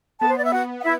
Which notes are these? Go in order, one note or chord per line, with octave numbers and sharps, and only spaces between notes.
B3 A4 A5
C5
D5
E5
B3 F#4 F#5
F#5
B3 E4 E5